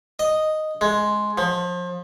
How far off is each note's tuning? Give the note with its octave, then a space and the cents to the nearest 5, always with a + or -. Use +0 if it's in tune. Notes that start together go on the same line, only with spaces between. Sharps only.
D#5 -5
G#3 +10
F3 +30